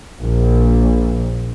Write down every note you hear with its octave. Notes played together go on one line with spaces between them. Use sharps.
A#1